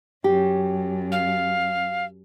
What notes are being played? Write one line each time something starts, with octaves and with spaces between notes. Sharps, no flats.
F#2 G4
F5